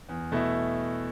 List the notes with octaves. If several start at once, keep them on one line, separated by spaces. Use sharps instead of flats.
E2
B2 A3 E4